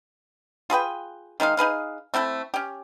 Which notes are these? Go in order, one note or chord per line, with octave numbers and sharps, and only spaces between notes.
F4 G#4 B4 G5
D#3 G#3 D#4 F5
D#4 G#4 B4 F5
A3 C4 E4 A4
C#4 G4